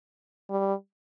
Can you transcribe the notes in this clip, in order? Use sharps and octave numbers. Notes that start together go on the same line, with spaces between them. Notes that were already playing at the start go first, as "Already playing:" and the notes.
G3